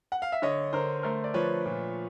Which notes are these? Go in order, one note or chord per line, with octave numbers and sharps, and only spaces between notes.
F#5
F5
E5
D3 C#5 D#5
D3 A#4 C5
A3 A#4 C5
D5
F3 B4 C#5
A#2